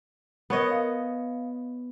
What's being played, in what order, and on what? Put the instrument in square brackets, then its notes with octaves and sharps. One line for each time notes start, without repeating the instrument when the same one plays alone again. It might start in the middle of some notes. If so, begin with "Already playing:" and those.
[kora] B3 C#5 D#5 [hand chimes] A#4
[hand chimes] F5